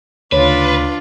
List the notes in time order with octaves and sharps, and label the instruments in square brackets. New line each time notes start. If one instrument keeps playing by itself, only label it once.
[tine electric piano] D2 C#3 [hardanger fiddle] D4 F4 [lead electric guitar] B4 [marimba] C#5